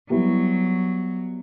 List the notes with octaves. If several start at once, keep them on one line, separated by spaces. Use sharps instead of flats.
F#3 G3 B3 E4 G4